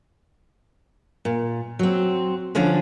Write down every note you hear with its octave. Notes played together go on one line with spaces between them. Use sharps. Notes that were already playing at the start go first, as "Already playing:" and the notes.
A#2
F#3 C4
D3 F3 C#4 D4